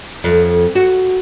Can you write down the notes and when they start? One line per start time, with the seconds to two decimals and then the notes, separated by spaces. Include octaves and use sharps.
0.24 F2
0.75 F#4